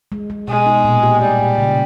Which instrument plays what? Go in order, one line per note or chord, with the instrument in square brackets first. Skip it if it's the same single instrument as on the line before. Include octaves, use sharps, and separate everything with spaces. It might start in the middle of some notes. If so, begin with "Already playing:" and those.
[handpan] G#3
G#3
[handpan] B2 [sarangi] G#3
[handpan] D#4
A#2
G4
[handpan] A#2 [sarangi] G3
[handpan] A#2
C#3